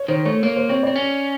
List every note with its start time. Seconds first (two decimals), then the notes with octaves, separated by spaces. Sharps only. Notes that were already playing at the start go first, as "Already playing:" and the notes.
Already playing: C#5
0.08 D#3 C5
0.25 A3 C#5
0.43 A#3 C#5
0.56 C5
0.69 C4 C#5
0.83 C4 D5
0.96 C#4